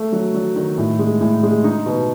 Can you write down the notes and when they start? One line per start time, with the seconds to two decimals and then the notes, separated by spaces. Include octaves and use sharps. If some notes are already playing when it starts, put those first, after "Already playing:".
Already playing: A3
0.12 F#3
0.34 F#3
0.56 D#3
0.78 A2
0.99 G#3
1.21 A2
1.43 G#3
1.64 D#4
1.86 B2